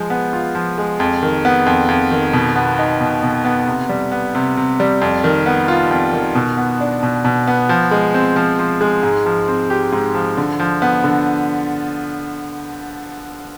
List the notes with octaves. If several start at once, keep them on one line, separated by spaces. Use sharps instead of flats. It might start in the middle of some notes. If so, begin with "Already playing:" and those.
Already playing: F3 G#3
B3
F4
F3
G#3
F2
D#3
B3
F2
F2
D#3
B2
B3
D#4
B2
B2
B3
C3
G3
B3
C3
C3
G3
F2
D#3
B3
F4
F2
D#3
B2
B3
D4
B2
B2
B3
F3
G#3
C4
F3
F3
G#3
G#2
F3
C4
G4
G#2
F3
D3
F3
B3
D3